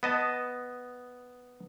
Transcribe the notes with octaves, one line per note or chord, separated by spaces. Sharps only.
B3 D#5 A5